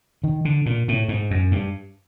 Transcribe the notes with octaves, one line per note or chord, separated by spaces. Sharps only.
D#3
D3
A#2
A2
G#2
F#2
G2